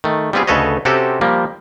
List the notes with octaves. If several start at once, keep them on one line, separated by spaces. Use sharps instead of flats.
D#3 A3
G3 B3 C4 F4 G#4
D2 C#3 A4 B4 C#5 D#5
C3 C4 C#4 F#4 G4 A4
F3 G3 A#3